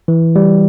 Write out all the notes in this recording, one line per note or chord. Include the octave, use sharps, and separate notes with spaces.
E3
G3